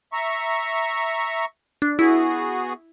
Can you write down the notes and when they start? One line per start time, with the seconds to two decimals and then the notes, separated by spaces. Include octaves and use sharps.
0.13 E5 A#5 C#6
1.82 D4
1.99 B3 E4 F#4 G#4